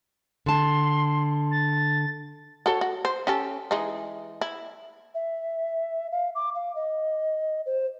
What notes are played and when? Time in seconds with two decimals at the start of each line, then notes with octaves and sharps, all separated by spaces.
0.46 D3 A5 C6
1.51 A6
2.66 F#4 A4 C#5
2.81 F#4
3.05 C5
3.27 C#4 G4 A4
3.71 E3 G#3 D#4
4.41 E4
5.15 E5
6.12 F5
6.35 D6
6.55 F5
6.75 D#5
7.66 C5